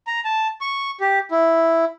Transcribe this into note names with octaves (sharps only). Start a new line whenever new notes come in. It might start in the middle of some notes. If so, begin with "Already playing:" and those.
A#5
A5
C#6
G4
E4